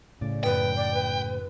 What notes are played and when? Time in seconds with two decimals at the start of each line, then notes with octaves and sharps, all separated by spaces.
0.21 A2 C#3 D5
0.44 G#1 F#2 B4 F#5 G5
0.76 D5
0.94 B4